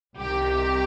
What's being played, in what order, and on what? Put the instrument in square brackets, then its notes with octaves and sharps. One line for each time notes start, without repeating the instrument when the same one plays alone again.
[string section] C2 C3 D#3 G4